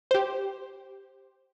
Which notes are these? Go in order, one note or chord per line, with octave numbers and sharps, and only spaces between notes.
G4 C5